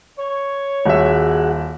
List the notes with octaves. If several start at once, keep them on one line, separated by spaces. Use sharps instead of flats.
C#5
D#1 F#4 G#4 E5 F#5